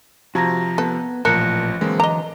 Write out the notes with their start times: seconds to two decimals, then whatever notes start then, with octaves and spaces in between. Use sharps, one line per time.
0.35 C3 F3 F#4 A5 A#5 G#6 A#6
0.78 B3 A4 B4
1.25 A1 A#2 F3 A#4 A5 F#6 A#6 C#7
1.81 D3 E3 F#3 G#3 A#3 C4
2.00 D#5 A#5 D6